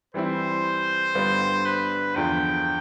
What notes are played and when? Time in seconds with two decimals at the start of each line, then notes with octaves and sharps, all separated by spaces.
0.14 E3 G3 C4 E4 C5
1.15 G2 D3 G3 B3 F4
1.65 B4
2.16 E2 D3 F3 G5